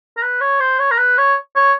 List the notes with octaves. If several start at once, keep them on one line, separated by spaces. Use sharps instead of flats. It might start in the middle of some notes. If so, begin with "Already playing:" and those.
A#4
B4
C#5
C5
C#5
A#4
B4
C#5
C#5